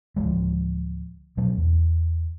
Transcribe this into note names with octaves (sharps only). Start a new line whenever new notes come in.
D1 D2 F3 G#3
B2 F#3 A3
E2